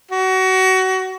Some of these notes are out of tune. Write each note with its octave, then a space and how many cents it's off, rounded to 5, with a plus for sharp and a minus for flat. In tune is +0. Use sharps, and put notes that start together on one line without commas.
F#4 +25